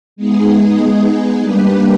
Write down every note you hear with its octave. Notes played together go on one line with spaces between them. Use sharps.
G#3 B3 D#4 G#4
G3 A#3 D4 G4 B4